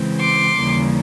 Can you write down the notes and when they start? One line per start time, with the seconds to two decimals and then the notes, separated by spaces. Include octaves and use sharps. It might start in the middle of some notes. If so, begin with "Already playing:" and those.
Already playing: C#3 E3 G#3 C4
0.19 C6 D6
0.56 D#2 C#3 E3 G3 A#3